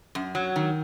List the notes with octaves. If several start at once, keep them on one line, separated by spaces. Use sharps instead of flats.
F#2
F#3
D#3